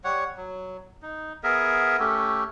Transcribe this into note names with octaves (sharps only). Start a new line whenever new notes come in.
G3 C#5 F#5
F#3
D#4
B3 G#4 A#4 E5
A3 C#4 G4 A4